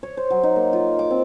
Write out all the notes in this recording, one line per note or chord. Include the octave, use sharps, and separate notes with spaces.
C#5
C5
F#3
D#4
A#3
F4
D6
C4